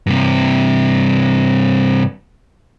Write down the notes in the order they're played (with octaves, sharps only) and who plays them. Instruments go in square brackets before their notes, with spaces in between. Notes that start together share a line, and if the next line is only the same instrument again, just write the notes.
[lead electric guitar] G2 C3